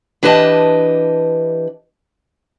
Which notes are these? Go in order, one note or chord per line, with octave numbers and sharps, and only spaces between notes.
E3 D4 G4 B4 D#5 A5